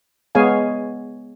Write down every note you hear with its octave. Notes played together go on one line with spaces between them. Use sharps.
G#3 B3 G#4 C#5 F5 G#5